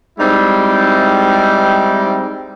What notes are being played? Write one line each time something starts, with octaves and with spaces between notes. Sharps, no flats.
G3 G#3 C4 D#4 E4